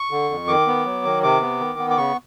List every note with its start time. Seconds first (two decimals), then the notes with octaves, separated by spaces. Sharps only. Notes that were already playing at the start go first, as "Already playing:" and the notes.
Already playing: C#6
0.11 D3
0.30 F2
0.48 D#3 D6
0.67 B3
0.85 F#3
1.05 D#3
1.23 C3 D6
1.41 B3
1.60 D#3
1.79 B3
1.90 D6
1.97 C#3 C#6